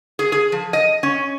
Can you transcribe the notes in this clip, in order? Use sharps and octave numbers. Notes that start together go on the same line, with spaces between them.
G#4
G#4
F3
D#5
C#4